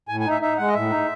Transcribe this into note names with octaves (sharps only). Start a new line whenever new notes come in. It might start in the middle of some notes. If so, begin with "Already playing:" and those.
A2 G#5
G#5
D#4 E5
D#4 E5
G#3 F#5
D#5
A2 E5
D#4